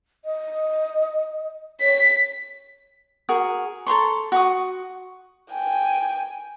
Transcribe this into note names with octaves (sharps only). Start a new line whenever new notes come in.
D#5
C#5 B6
F#4 G#4 A#4
A4 A#5 C6 C#6
F#4 C#6 D#6
G5 G#5